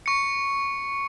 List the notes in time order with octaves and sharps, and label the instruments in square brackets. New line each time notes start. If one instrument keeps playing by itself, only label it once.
[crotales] C#6 C#7